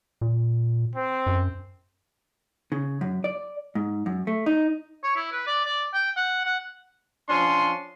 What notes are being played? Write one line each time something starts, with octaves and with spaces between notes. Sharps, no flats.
A#2
C4
F#2
C#3
F#2
D5
G#2
F#2
A3
D#4
C#5
E4
B4
D5
D5
G5
F#5
F#5
F3 C#4 D4 C6